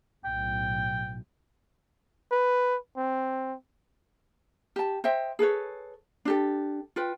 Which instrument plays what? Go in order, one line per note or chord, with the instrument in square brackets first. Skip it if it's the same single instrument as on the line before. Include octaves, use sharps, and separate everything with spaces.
[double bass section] B1 A2 [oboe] G5
[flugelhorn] B4
C4
[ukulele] G4 A5
C5 D#5 E5 G5
G#4 A4 B4 C#5
D4 G4 A4
F4 B4 G5